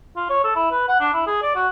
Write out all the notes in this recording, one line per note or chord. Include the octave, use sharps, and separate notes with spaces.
F4
C#5
A4
E4
B4
F#5
D4
E4
G#4
D5
F#4